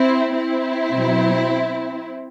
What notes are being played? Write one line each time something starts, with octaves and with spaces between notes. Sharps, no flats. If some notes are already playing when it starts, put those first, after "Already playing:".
Already playing: C4 E4
C4 E4
B2 F#3